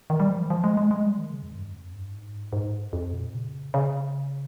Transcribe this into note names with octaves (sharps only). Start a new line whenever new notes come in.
D#3
G3
F3
D#3
F3
G#3
G#3
G#3
G3
D#3
C#3
F2
G2
F2
G2
G#2
G#2
F2
A#2
C#3
C#3